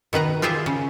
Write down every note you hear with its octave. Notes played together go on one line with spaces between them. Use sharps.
B2 D#3 B4 A#5
F4 G4 G#4 C5 E5
C#3